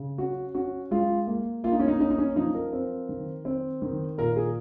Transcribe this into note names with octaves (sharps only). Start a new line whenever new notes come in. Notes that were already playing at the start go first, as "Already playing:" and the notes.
Already playing: C#3
C#4 F#4
C#4 F#4
G#3 F4
A#3
A#3 F4
D#4
C#4
D#4
C#4 D#4
D#4
C#4
F3 D#4
A#4
C4
D#3
C4
D#3
A#2 A#4
G#4